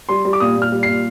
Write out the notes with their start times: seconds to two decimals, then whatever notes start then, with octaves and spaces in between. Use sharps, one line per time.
0.09 G3 C6
0.25 G3
0.33 D6
0.40 A#2 D#6
0.57 A#2
0.62 F6
0.72 G3
0.83 C7
0.88 A#2